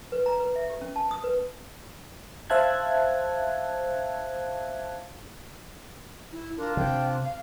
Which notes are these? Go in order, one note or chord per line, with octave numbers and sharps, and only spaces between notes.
B4
A#5
B4
E5
G4
C#4
A5
D#6
B4
C5 E5 F5 A5 F#6 G#6
E4
D4 F4 A#4
C3 G5
F5